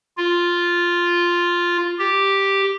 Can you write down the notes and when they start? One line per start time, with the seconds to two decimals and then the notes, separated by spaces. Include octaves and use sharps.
0.17 F4
1.99 G4